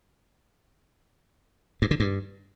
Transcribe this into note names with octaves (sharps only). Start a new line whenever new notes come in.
G2
D3
G2